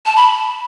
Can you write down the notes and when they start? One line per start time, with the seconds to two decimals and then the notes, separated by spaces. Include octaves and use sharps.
0.06 A5
0.16 B5